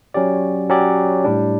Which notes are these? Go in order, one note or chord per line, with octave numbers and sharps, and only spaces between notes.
F#3 C#4 G4 D5
F#3 C#4 G4 D5
A2 G3 D4